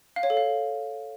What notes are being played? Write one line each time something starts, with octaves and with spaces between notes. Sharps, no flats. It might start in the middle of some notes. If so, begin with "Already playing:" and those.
F5
C#5
A4
F5